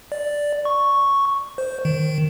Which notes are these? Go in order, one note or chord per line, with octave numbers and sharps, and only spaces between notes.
D5
C#6
C5
D#3